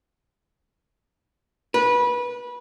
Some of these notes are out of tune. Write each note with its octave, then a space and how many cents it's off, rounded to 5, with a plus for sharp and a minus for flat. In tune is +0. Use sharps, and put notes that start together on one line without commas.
B4 -20